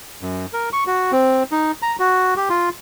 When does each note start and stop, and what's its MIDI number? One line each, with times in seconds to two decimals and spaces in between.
0.22 0.46 42
0.53 0.69 70
0.73 0.84 85
0.87 1.12 66
1.12 1.43 60
1.52 1.71 63
1.82 1.96 82
1.99 2.34 66
2.37 2.49 67
2.50 2.69 65